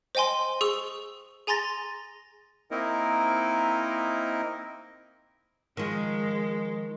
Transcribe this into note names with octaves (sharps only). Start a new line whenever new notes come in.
C5 D#5 G5 G#5 C6
G#4 C#6 E6
G#4 G#5 A#5 C6 A6 A#6
A#3 C4 D#4 E4 A#4 D#5
D#3 F3 G#3